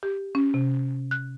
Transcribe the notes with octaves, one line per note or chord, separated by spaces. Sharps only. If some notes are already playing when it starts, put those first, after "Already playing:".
G4
C#4
C3
F#6